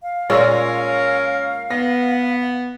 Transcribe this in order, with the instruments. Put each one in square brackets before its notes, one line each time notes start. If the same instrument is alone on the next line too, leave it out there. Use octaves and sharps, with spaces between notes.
[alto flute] F5
[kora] A#2 G#3 F4 [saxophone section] C#4 A#4 [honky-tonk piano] C#5 C#6 E6
[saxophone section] B3 [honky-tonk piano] A#6